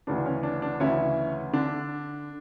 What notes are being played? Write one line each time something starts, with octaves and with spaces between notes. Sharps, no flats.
D2 C#3 E3 D4
C#4
D4
D4
D2 C#3 E3 C#4 E4
D3 D4